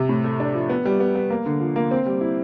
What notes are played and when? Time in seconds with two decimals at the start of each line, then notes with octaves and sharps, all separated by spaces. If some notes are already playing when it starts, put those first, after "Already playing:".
Already playing: C3
0.09 A2
0.24 A3
0.40 D4
0.55 F3
0.69 B3
0.85 G3
1.00 B3
1.15 B3
1.30 A#3
1.46 D3
1.61 F3
1.76 A#3
1.91 C4
2.06 G3
2.21 E4